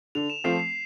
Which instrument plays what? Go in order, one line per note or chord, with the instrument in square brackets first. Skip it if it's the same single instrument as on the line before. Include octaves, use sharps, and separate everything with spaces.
[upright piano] D3 [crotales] F7
[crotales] E7
[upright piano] F3 A3 C4 F4 [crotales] C7
[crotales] C7